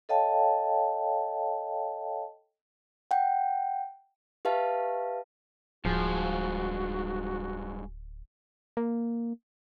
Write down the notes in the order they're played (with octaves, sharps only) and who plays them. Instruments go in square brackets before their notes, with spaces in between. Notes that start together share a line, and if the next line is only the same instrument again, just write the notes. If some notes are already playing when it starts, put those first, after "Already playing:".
[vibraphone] A4 C#5 D#5 F5 G5 A5
[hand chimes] F#5 G5
G4 B4 E5 F5 A5
[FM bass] D1 [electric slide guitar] G2 G#3 G#4 [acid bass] F3 [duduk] F#4
[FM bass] A#3